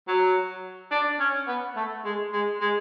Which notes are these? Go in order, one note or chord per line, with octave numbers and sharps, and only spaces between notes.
F#3
D4
C#4
B3
A3
G#3
G#3
G#3